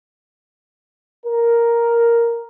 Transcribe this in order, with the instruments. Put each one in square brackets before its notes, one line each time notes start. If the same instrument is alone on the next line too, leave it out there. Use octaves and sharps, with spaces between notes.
[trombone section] A#4